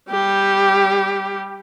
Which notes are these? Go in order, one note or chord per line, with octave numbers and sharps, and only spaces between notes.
G3 G4